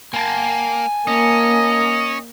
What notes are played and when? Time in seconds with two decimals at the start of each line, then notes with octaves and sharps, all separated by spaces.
0.14 A#3 G#5 A5
1.07 A#3 C#4 D#5